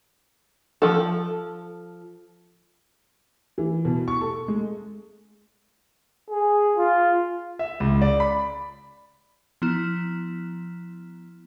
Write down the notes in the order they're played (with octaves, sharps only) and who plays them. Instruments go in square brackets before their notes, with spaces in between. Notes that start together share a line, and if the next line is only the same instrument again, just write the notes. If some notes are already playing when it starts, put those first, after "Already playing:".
[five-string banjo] F3 A4
[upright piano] E3
B2
C#6
A4
G#3
[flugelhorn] G#4
F4
[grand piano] E5
C#2
D5
B5
[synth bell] F3 B3 E4